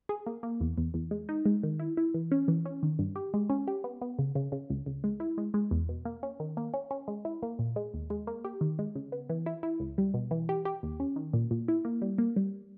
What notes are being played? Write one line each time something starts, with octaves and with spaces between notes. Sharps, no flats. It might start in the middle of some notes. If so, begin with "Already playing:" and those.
G#4
A#3
A#3
E2
E2
E2
G#3
D#4
G#3
D#3
E4
E4
E3
C#4
E3
C#4
D#3
G2
G4
G#3
C#4
G4
B3
B3
C#3
C#3
C#3
C#2
C#2
G#3
E4
G#3
G#3
E2
B2
A#3
C#4
D#3
A#3
C#4
C#4
G#3
E4
A#3
A#2
G#3
D#2
G#3
A#3
G4
D#3
G#3
C#3
B3
E3
E4
E4
C#2
G3
B2
E3
G4
G4
D#2
C#4
D#3
A#2
A#2
E4
A#3
G3
A#3
G3